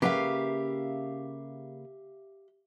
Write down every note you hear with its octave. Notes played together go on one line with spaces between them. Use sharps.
C#3 A#3 G4 B4 E5 F5